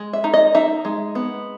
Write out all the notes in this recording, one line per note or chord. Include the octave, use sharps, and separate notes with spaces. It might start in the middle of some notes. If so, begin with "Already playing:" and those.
Already playing: G#3
E5
D#4
D#5
D#4 E5
G#3
B3